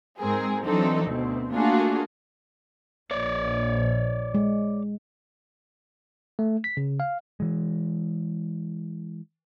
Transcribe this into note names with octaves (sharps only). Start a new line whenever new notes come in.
G#2 G#3 C4 G#4 A#4
E3 F#3 C4 D4 D#4 A4
D2 B2 C4
A3 A#3 D4 F4 F#4 G#4
A#1 C#5 D5
G#3
A3
B6
C#3
F5
E3 G#3